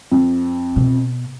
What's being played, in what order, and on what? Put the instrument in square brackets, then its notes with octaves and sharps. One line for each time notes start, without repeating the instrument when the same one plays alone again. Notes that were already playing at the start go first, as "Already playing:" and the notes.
[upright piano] F2
[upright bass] B2